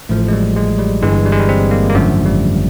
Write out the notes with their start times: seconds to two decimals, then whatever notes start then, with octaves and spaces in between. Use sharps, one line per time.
0.09 A1 A2 F3 A3
0.28 G#3
0.33 G3
0.56 G#3
0.79 G3
1.02 G1 G2 E3 G#3
1.26 G3
1.32 G#3
1.40 G3
1.49 C4
1.71 A#3
1.89 A#3
1.95 G#1 F#2 D3 F3 A3
2.26 G3